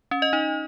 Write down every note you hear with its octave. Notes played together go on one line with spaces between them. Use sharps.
C#4
D#5
D#4